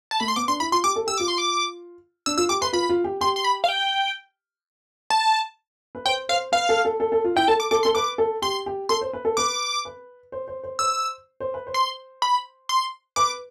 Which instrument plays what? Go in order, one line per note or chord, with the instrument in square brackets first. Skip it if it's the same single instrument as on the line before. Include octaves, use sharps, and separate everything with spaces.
[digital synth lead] A5
[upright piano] A3 [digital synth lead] B5
[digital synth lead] C6
[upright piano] B3 [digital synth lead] D6
[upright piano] D4 [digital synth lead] C6
[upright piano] E4 [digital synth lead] B5
[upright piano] F4 [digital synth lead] C6
[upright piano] G4 [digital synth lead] D6
[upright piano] A4
[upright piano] G4 [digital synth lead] E6
[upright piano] F4 [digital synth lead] D6
[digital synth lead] C6
D6
[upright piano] D4 [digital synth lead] E6
[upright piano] F4 [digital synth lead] E6
[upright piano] G4 [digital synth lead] D6
[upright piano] B4 [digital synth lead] C6
[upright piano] F4 [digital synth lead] B5
[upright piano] F4
G4
[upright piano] G4 [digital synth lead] C6
[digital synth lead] C6
B5
F5
G5
A5
[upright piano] B4
[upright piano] C5 [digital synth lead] G5
[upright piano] C5 [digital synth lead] F5
[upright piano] B4 [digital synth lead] F5
[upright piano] A4
A4
A4
A4
F4
[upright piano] E4 [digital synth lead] G5
[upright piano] A4 [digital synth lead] A5
[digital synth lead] D6
[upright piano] A4 [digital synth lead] D6
[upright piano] A4 [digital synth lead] C6
[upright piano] B4 [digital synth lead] D6
[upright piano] A4
[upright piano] G4 [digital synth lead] C6
[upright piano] G4
[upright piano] A4 [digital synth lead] C6
[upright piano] C5
B4
A4
[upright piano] B4 [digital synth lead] D6
[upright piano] B4
C5
C5
C5
[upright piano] C5 [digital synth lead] E6
[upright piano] C5
B4
C5
[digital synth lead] C6
B5
C6
[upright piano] B4 [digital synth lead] D6